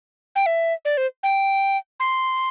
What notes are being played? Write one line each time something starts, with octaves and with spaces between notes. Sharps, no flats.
G5
E5
D5
C5
G5
C6